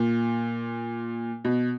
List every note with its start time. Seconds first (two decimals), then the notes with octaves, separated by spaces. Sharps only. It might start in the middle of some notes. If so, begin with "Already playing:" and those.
Already playing: A#2
1.45 B2